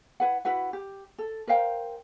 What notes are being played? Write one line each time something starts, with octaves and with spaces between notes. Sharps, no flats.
E4 B4 F#5
E4 F#4 B4 F#5
G4
A4
A#4 C5 F5 G5